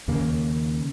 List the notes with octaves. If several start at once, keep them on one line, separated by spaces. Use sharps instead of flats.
D#2 C#3 A#3